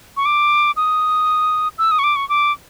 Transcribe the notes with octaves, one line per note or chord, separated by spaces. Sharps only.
C#6
D6
D#6
E6
D#6
C#6
D6
C#6
D6